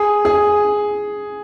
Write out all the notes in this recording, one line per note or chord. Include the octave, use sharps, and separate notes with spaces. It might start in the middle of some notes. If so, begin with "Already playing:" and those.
Already playing: G#4
G#4